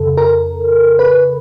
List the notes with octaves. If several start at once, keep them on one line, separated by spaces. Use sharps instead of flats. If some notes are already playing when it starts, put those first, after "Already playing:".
Already playing: F2 C#3 A4
A#4
B4